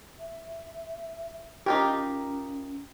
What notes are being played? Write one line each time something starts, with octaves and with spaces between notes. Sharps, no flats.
E5
C#4 D#4 F4 G4 A#4